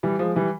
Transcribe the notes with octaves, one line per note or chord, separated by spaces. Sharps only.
E3 G3
F3 G#3
E3 G3